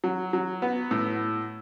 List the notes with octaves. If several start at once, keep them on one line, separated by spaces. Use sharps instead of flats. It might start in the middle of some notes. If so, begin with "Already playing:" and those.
F#3
F#3
B3
A2